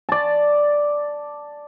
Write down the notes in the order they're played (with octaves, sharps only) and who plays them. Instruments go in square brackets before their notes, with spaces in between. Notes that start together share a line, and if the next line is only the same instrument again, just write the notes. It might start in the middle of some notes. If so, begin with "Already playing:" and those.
[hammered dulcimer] D5 A5